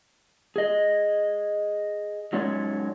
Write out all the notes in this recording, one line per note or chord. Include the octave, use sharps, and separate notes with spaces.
G#4 D#5
F#3 G#3 C#4 D#4 C#5 D5